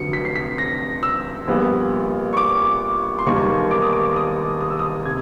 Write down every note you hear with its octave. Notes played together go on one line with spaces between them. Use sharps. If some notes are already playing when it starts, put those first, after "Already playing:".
Already playing: F1 F2 D3 F#3 C#7
B6
C7
B6
A#6
E6
A#1 A#2 G3 B3
C#6
D6
C6
E1 D#2 D#3 G3 A#3 C#6
D6
D#6
D6
D#6
D#6
E6
D#6
C3 G#6